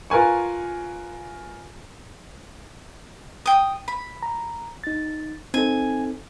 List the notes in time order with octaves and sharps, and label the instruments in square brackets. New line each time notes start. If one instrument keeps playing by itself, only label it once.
[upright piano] F4 A#4 B4 G#5 C#6
[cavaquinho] G5 D#6
B5
[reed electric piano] A#5
D#4 A6
[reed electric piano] C4 D#4 A4 [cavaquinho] G#5